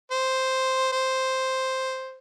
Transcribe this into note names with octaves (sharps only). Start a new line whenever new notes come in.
C5
C5